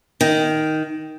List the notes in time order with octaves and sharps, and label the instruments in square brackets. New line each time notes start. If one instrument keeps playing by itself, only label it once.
[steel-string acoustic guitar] D#3